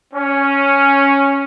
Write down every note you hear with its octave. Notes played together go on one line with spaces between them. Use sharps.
C#4